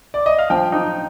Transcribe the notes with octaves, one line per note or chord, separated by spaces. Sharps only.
D5
D#5
F5
F3 G5
D#4